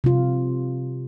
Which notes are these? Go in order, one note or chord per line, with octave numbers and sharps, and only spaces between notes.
C3 F4